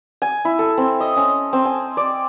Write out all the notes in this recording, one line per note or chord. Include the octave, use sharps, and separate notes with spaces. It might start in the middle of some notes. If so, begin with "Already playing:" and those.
G#5
E4
A4
C4
D#5
C#4
C4
G#5
D5